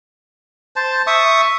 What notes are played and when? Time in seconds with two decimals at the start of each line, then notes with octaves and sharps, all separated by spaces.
0.76 C5 A5
1.07 E5 C#6 D#6